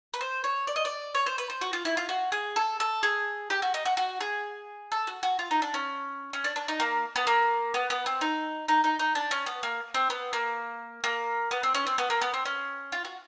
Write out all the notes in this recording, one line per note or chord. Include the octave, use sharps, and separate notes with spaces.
B4
C5
C#5
D5
D#5
D5
C#5
C5
B4
C5
F#4
F4
E4
F4
F#4
G#4
A4
A4
G#4
G4
F#4
D#4
F#4
F#4
G#4
A4
F#4
F#4
F4
D#4
D4
C#4
C#4
D4
D4
D#4
A#3
B3
A#3
B3
B3
C4
D#4
D#4
D#4
D#4
D4
C#4
B3
A#3
C4
B3
A#3
A#3
B3
C4
C#4
C4
B3
A#3
B3
C4
C#4
F4
F#4